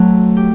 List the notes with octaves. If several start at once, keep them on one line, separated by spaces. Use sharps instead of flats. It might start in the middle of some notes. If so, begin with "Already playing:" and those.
Already playing: F#3 A3 C4
G4